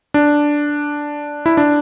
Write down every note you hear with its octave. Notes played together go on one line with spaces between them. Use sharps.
D4
E4
D4